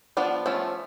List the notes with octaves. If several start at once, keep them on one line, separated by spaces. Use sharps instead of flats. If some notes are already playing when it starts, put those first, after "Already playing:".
F3 B3 D4 F4
F3 A3 C#4 F4